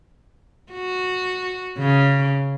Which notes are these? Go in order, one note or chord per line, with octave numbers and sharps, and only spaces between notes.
F#4
C#3